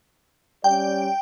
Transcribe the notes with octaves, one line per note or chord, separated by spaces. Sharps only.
G3 C#4 D5 G5